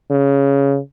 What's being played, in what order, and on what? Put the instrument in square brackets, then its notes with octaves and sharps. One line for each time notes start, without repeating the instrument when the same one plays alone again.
[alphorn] C#3